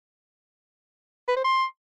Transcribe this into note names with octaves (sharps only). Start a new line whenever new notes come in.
B4
C5
C6